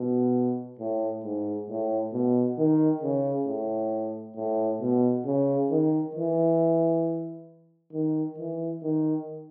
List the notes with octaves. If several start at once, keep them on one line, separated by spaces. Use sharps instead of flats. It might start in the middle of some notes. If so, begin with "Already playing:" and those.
Already playing: B2
A2
G#2
A2
B2
D#3
C#3
A2
A2
B2
C#3
D#3
E3
D#3
E3
D#3